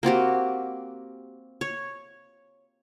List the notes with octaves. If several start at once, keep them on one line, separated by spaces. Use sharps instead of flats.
A#3 C4 F#4 G4
C#5